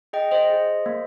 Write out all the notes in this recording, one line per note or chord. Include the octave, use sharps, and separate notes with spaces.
G#4 D#5 G5
C5 D#5
G#4
A#3